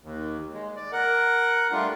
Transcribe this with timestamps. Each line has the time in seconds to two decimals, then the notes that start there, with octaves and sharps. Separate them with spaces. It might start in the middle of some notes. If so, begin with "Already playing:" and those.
0.03 D#2
0.53 G#3
0.76 D5
0.92 A#4 F#5
1.72 G3 A3 D4 F4